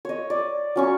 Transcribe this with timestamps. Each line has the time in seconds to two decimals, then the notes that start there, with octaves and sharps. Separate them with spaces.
0.05 C#5 D#5
0.30 D5
0.76 F#3 C#4 C#6